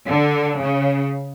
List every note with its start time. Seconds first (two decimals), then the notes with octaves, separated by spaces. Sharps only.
0.09 D3
0.60 C#3